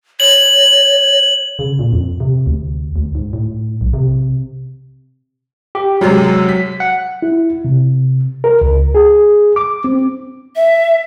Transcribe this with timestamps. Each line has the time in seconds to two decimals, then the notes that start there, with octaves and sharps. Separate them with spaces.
0.20 C#5 F#7
1.59 C#3
1.79 A#2
1.93 F2
2.20 C3
2.46 D2
2.96 D2
3.15 G#2
3.33 A2
3.81 B1
3.94 C3
5.75 G4
6.01 F#2 C3 F#3 G#3
6.49 B6
6.80 F#5
7.22 E4
7.65 C3
8.44 A#4
8.61 C#2
8.95 G#4
9.56 D6
9.84 C4
10.56 E5